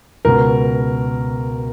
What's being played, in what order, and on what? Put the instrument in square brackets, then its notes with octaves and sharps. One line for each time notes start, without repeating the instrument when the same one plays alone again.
[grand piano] C#2 B2 A#4